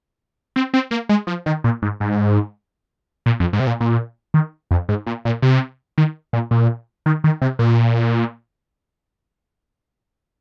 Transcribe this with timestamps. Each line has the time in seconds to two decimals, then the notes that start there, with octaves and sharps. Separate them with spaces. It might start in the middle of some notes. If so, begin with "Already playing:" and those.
0.56 C4
0.74 C4
0.91 A#3
1.09 G#3
1.27 F3
1.46 D#3
1.64 A#2
1.82 G#2
2.00 G#2
3.26 A#2
3.40 F2
3.53 G#2
3.60 C3
3.67 A#2
3.80 A#2
4.34 D#3
4.71 F2
4.89 G#2
5.07 A#2
5.25 A#2
5.42 C3
5.98 D#3
6.33 A#2
6.51 A#2
7.06 D#3
7.24 D#3
7.42 C3
7.59 A#2